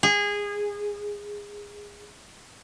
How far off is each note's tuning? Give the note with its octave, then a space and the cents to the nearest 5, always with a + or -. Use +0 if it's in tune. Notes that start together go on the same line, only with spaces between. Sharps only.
G#4 -20